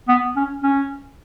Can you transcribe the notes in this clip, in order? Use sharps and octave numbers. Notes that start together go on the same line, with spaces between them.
B3
C#4
C#4